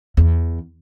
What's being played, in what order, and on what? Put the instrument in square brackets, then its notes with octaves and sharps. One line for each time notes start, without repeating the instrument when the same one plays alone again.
[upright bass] E2